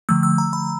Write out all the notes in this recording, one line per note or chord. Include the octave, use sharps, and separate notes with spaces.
D3 F3 A3 E6
E6
A#5
B5